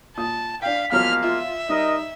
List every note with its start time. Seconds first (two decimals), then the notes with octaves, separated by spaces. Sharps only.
0.17 A#2 A5 D#6
0.62 D4 F5 G5 B6
0.92 E2 F3 F#3 G#3 A#3 F5 F6
1.24 F4 E5
1.69 G3 D#4 A#4 D#5